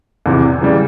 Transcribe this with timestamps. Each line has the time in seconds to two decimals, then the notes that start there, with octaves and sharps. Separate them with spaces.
0.26 E2 C3 E3
0.61 C#3 E3 G3